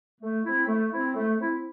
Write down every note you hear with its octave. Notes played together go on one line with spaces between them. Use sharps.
A3
C4 E4
A3
C4 E4
A3
C4 E4